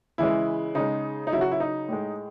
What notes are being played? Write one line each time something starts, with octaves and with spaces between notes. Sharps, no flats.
C#3 E3 G#3 E4
C#3 G#3 D#4
D#4
C#3 F#3 E4
F#4
E4
D#4
A2 G#3